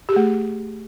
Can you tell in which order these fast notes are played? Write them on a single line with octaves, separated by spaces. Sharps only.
G4 G#4 A3